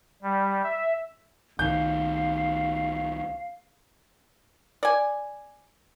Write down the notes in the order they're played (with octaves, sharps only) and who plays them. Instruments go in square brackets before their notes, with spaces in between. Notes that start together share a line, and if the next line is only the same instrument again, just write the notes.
[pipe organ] G3
E5
[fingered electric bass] C2 D#3 [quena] F5 [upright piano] G6
[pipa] D5 G#5